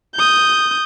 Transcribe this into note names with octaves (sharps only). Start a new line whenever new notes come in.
D#6 G6